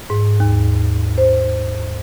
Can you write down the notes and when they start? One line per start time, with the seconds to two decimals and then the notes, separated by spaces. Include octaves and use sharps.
0.10 G#2
0.40 D#2
1.18 C5